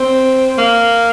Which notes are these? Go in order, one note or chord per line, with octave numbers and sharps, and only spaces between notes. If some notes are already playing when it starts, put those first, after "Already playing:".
Already playing: C4
A#3